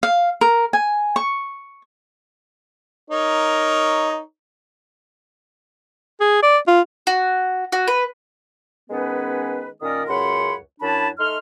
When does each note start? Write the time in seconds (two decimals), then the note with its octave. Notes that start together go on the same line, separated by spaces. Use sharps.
0.03 F5
0.41 A#4
0.73 G#5
1.16 C#6
3.10 D#4 A#4 C#5
6.20 G#4
6.42 D5
6.67 F4
7.07 F#4
7.72 F#4
7.88 B4
8.90 D#3 G#3 B3 C#4 B4
9.82 A#2 D#3 C#4 A#4 D5 D#6
10.09 C#2 F#2 C#5 F#5 B5 C6
10.81 F#2 F#3 D4 E4 A5 B5
11.19 A3 D#4 C6 F6